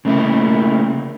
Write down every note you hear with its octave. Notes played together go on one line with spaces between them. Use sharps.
C#3 A3 A#3 E4